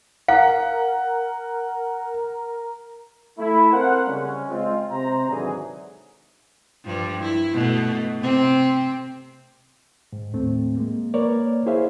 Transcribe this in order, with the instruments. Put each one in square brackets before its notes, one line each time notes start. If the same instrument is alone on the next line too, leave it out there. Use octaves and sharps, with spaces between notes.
[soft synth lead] A#4 [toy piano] F5 [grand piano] F#5
[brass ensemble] A3 E4
C4 A#4 C5 F5 F#5
C#3 G3 G#3 C#4
G#3 C4 F4
C3 C5 A#5
G#1 D3 E3 F#3 G#4
[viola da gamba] G2 F3 G3
E4
B2 A3
C3 C4
[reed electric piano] G#2
D#2 A2 A3 C4
G#3 A#3
A#3 A#4 B4 C#5 D5
E4 G#4 C5 C#5 E5 F5